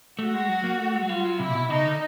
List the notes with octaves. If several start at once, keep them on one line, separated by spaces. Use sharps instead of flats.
A3 F#4
G#3
F#3
A#3
A3
G#3
F#3
G3 F4
F#3
C3 E4
A#2
B2
C#3 D#4
D3